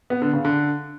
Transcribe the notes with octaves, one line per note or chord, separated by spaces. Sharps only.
B3
D3
C#3
D3